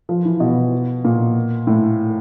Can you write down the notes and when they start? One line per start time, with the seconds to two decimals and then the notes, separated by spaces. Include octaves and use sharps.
0.09 F3
0.25 E3
0.40 B2
1.05 A#2
1.67 A2